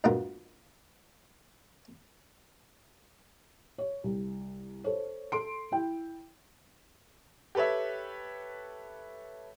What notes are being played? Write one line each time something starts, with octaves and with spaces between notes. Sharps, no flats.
D2 G2 B2 B3 F4 A#4
C#5
C2
A4 C5 C#5
A4 C6 D7
E4 G5
G4 A4 B4 C#5 E5